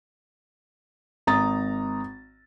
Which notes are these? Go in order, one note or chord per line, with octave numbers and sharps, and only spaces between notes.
G#1 A#5 D#6 A6